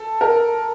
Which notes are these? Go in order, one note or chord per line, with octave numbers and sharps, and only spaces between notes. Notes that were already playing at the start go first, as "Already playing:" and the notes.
Already playing: A4
A#4